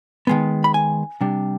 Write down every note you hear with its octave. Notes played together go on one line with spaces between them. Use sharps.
D#3 G#3 B3
B5
G#5
C3 G3 D4